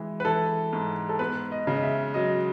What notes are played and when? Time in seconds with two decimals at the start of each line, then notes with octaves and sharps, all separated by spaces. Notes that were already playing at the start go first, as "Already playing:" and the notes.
Already playing: E3 G#3
0.20 B4
0.25 E3 A4
0.73 G#2
1.09 A4
1.19 B3 B4
1.52 D#5
1.67 C#3
1.77 D#5
1.83 E5
2.14 F#3 D#5